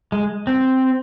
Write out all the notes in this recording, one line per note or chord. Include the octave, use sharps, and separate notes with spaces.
G#3
C4